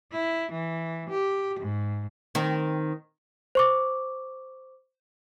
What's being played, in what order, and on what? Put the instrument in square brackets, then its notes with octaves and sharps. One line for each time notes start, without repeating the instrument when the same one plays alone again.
[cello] E4
E3
G4
G#2
[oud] D#3 C4
[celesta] C5 C#6 D6